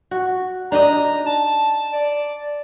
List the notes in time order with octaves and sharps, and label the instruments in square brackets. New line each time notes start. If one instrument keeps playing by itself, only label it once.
[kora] F#4
[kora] D4 D#4 D#5 [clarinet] A#5
[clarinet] A5
D5